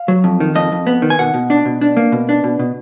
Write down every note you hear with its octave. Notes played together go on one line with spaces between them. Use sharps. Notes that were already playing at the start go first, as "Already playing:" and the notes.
Already playing: F5
F#3
F2
D#3
F2 D#5
F2
B3
D#3
G#5
B2 F#5
B2
D4
B2
D4
A#3
B2
D4
B2
B2